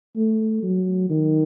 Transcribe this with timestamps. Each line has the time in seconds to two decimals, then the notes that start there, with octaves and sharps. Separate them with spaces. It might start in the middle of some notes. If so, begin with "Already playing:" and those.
0.16 A3
0.63 F#3
1.10 D#3